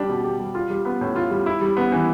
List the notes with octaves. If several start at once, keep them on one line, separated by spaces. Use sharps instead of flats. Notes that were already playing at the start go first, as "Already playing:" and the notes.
Already playing: G3 D4 G4
B2
G4
G3
F4
G3
B3
A2
F4
G3
E4
G3
B3
E3